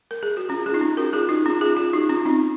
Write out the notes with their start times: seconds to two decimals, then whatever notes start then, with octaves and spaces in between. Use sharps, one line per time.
0.11 A#4
0.23 G#4
0.37 F#4
0.49 C#4 F4
0.66 F4 G#4
0.74 D#4
0.81 C#4
0.97 F#4 A#4
1.13 F4 G#4
1.29 D#4 F#4
1.46 C#4 F4
1.61 F4 G#4
1.77 F4 G#4
1.93 D#4 F#4
2.09 C#4 F4
2.25 C4 D#4